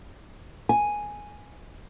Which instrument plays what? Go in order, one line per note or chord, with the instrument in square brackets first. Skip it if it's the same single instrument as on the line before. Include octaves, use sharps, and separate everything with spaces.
[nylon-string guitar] G#5